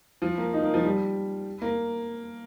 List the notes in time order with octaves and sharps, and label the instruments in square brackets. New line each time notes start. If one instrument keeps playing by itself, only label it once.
[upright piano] F3
A#3
D#4
A#3
F3
G3
A#3